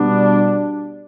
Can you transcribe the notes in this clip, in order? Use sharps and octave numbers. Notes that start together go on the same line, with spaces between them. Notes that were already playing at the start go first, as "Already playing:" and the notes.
Already playing: B2 G3 B3 D4